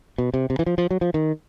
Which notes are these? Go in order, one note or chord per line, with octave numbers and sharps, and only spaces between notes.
B2
C3
C3
E3
F3
F3
F#3
F3
D#3